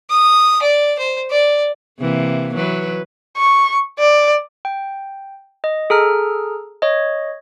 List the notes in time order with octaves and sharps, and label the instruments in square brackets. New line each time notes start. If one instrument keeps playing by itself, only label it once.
[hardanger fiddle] D#6
D5
C5
D5
[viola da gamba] C3 E3 A#3
E3 F#3 B4
[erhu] C#6
D5
[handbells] G5
D#5
G#4 A4 A#5 F6
C#5 D#5